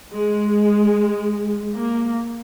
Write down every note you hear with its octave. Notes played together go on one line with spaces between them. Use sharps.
G#3
A#3